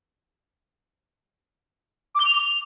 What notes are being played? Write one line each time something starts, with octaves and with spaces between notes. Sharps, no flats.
D6
G7
F7